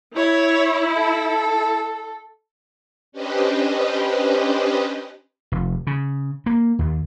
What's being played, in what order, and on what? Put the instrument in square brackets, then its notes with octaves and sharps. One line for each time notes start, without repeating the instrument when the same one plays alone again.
[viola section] E4 [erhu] C#5
[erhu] A4
[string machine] C#4 D4 G4 B4 C5 D#5
[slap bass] F1
C#3
A#3
D#2